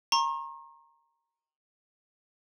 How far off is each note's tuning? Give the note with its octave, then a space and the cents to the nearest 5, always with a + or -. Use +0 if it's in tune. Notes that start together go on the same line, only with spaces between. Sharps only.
A#5 +0 C#6 -45